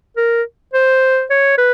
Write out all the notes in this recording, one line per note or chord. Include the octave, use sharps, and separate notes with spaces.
A#4
C5
C#5
B4